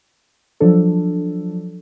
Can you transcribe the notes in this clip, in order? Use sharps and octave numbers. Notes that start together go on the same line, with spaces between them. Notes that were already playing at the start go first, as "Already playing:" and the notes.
F3 F#3 D4 A4